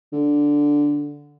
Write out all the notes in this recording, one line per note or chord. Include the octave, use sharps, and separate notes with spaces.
D3